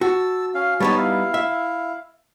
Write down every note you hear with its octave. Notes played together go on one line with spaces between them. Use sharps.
F#4 A5 E6
C#4 F5
G3 B3 D#4 C#5 A5
E4 F5
E5